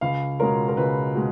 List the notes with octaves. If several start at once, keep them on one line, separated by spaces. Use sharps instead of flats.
C#2 F5
B2 G#3 C#4 F4 A#4
A#4
C#2 B4
B2 G#3